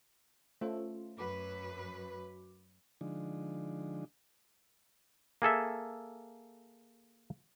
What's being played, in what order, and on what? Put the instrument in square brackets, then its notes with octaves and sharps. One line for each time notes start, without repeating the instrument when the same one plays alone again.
[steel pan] A3 [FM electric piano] C#4 F4 C5
[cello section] F#2 B4 [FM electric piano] F#4 D6
[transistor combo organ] D3 F3 G#3 D4 D#4
[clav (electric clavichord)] A#3 G#4 A4 E5